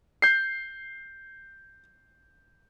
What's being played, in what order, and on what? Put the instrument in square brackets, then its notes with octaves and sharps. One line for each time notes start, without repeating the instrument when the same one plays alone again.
[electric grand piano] G6 C7